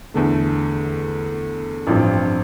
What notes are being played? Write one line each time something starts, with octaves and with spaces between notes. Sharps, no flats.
E2 D3 A3
A1 G2 F3 C4